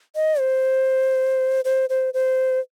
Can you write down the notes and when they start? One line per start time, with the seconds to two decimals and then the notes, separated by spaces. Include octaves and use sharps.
0.16 D#5
0.39 C5
1.65 C5
1.90 C5
2.14 C5